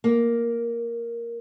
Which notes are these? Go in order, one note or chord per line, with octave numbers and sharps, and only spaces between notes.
A#3